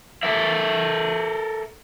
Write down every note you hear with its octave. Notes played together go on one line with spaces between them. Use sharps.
A4 A#4 E5